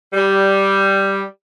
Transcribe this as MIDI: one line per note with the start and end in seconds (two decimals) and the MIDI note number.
0.13 1.21 55